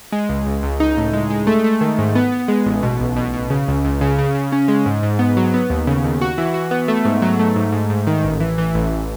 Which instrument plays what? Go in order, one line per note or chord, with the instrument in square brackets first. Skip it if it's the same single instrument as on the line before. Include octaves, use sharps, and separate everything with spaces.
[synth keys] G#3
C#2
C#2
C#2
D#4
A2
G#3
G#3
A3
A3
D#3
G#2
B3
B3
G#3
A1
B2
B1
B2
B2
C#3
C#2
C#2
C#3
C#3
C#3
C#4
G#3
G#2
G#2
B3
F#3
B3
D#2
C#3
D#2
F#4
E3
F#4
B3
A3
G#2
F#3
A3
G#2
G#2
G#2
D#3
A1
E3
E3
A1